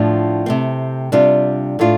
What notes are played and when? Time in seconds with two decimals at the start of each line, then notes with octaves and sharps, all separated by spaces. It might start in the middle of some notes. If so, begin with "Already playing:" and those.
Already playing: A2 F3 D4 F4
0.46 C3 A3 C4
1.12 C3 G3 D4 F4
1.79 A2 A3 D4 F4